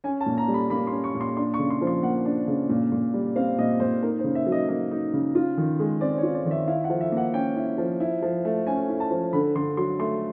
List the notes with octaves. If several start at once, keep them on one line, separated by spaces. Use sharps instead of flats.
C#4 G#5
A5
A#2
A#5
G3
B5
A#3 B5
C6
C#4
C#6
A#2
C6
D4 C6
C#6
C#3
C6
F3
C6
A#3 F#5
D4
C#3
A#2
A#2
G3
C4 F5
A#2 D#5
A#2 C5
D#4 A#4
C5
C#3
E5
F#3
D#5
A#3 D#5
D#4
C#3
F4
D#3
G#3
C4 D5
C#5
F4
D5
D#3
E5
E4 F5
F#5
F3
E5
A#3 F#5
C#4 G5
E4
F3
E4
F3
A3
C#4 G#5
E4
A5
F3
D3 B5
D3 C6
F#3 C6
A3 C6